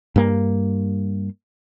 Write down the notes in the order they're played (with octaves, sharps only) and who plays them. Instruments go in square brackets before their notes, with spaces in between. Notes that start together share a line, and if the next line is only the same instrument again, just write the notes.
[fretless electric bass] G2 A#3